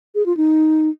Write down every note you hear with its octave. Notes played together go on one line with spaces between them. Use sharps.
G#4
F4
D#4